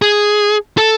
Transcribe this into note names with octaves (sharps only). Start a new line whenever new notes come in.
G#4
A4